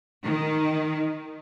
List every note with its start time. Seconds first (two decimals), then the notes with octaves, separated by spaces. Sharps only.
0.24 D#3